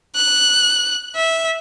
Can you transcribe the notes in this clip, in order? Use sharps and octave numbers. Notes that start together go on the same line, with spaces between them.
F#6
E5